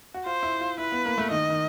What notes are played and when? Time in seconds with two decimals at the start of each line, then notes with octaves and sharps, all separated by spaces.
0.14 F#4
0.25 F4 C5
0.43 E4
0.61 F4
0.78 E4 B4
0.92 B3
1.05 A#3
1.18 A3
1.31 D#3 D#5
1.50 D#3